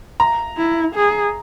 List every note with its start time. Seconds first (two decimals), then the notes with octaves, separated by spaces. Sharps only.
0.20 A#5
0.57 E4
0.95 G#4